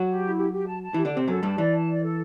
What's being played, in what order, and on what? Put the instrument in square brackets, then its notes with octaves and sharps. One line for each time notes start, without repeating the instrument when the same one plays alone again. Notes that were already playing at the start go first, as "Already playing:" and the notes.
Already playing: [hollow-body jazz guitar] F#3 F#4
[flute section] G4
E4
G4
G4
A5
A5
[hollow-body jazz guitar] E3 E4 [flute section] G4
[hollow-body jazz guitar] D3 D4
[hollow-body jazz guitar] C3 C4 [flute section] G4
[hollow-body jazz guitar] F#2 F#3 [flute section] A4
[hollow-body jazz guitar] G2 G3 [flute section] A5
[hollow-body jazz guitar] E3 [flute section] D5
[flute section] A5
D5
A4